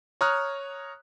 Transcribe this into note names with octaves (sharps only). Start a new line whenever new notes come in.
C#5 A#5 D#6 F6 F#6